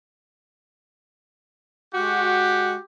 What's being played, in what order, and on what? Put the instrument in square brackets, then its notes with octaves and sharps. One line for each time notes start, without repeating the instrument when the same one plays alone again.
[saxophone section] G#3 F#4 [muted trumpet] G4